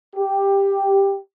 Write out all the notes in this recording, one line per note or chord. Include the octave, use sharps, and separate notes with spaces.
G4